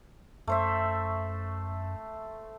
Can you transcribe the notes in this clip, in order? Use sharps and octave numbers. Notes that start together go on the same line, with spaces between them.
F#2 A3 C5 E5